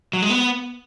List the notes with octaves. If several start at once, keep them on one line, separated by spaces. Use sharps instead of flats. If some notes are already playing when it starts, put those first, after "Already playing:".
F#3
G#3
B3